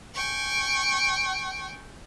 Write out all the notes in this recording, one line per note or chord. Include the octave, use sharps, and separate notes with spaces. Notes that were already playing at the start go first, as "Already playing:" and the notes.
G5 G#5 C#6